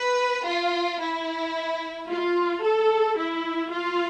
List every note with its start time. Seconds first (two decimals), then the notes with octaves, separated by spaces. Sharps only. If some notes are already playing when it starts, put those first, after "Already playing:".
Already playing: B4
0.47 F4
1.01 E4
2.08 F4
2.62 A4
3.17 E4
3.71 F4